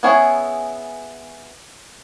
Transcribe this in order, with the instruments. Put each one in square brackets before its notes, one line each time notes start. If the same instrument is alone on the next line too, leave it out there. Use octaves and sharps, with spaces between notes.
[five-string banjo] B3 C#4 E4 G#4 C#5